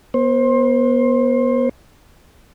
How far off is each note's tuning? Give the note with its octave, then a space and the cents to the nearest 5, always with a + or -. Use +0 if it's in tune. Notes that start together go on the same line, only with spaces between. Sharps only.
B3 -30 C5 +25